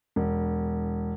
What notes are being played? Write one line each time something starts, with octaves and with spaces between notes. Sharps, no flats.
E1